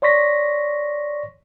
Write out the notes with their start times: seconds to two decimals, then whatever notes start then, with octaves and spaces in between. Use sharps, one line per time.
0.02 C#5 D5 C6 C#6 A#6 B6